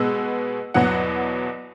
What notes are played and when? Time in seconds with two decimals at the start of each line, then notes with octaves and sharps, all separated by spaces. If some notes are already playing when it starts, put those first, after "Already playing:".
Already playing: B2 G#3 B3 E6
0.74 E2 B2 F#3 B3 F#5